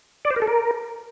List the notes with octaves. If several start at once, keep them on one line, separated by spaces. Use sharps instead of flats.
D5
C5
A#4
A4
A#4